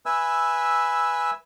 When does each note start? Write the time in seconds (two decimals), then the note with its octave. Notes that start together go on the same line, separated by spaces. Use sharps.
0.06 B4 E5 G#5 E6